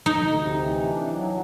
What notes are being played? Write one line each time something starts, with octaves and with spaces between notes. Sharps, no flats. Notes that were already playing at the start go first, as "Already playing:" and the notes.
D2 D#4
C3
E3
D4
F#3